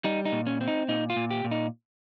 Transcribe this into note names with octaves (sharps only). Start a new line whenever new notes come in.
G3 D#4
D#4
A#2
C#4
C4
D#4
A#2 D#4
F4
A#2
G4
A#2
D#4